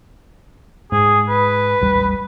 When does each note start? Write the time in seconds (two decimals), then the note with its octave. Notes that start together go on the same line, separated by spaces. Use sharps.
0.92 G#2 G#4
1.29 B4
1.81 A1 D#2 G3